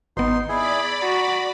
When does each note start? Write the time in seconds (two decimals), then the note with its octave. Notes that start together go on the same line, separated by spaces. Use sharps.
0.17 G#1 B3 D#4 C6
0.49 E4 G#4 D5 B5
1.01 F#4 A#5